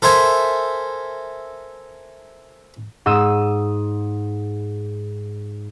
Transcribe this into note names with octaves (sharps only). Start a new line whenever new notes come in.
A4 A#4 C5 E5 G#5
G#2 D#6 E6 D#7 E7